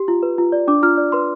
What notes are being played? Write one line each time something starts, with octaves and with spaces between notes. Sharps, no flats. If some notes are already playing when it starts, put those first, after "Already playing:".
Already playing: G4
F4
B4
F4
D5
D4 D6
F4 F6
D5
B4 C6